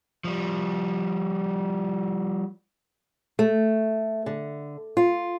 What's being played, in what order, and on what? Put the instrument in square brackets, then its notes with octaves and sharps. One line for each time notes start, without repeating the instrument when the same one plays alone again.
[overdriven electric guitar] F3 G3
[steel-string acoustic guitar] A3
D3
F4